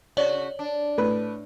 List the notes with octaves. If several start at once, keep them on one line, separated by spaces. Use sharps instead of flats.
C#3 F#4 C#5 D5
D4
A2 B4